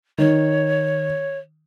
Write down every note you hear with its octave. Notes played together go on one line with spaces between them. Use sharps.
D#3 C#5